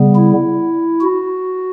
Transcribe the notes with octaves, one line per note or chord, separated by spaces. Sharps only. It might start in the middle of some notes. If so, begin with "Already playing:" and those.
Already playing: C#3 G3 B3
E4
F#4